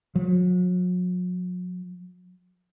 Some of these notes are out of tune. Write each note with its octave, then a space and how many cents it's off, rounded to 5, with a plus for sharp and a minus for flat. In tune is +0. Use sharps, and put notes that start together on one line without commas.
F#3 -40